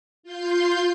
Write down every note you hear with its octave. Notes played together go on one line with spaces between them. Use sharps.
F4 C6 G6